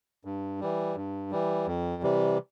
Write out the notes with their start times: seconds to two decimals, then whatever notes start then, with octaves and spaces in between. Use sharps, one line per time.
0.25 G2
0.60 E3 G3
0.96 G2
1.31 E3 G3
1.67 F2
2.03 C3 E3 G3